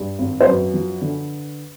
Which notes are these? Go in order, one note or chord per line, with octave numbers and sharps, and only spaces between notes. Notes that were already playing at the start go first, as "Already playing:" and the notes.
Already playing: G2
G#1
C5
F#2 B4
F3
D3